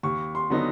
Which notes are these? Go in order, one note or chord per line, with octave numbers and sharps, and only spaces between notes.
D#2 C#6
C6
D3 F#3 B3 D#4